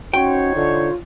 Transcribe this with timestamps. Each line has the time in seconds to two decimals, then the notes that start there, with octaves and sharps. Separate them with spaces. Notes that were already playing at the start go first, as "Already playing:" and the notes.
0.14 C#4 D#4 F#4 C5 C#5 G5
0.55 D3 F4